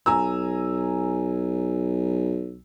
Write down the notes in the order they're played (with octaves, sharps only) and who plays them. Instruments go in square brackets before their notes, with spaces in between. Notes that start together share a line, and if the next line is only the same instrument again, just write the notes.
[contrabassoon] B1 [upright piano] G#5 A#5 E6